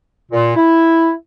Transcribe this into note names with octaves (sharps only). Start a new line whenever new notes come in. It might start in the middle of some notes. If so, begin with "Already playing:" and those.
A#2
E4